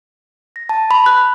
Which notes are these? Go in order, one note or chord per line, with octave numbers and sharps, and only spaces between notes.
A#6
A5
B5
F#6